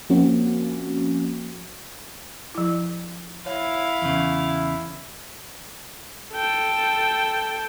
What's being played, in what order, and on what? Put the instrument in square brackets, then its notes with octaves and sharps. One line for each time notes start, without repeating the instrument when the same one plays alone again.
[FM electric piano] F3 A#3 C4 C#4 F#4
[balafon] F3 E4
[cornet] E4 [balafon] C#5 [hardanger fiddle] F5
[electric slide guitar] E2 C#3
[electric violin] A4 G5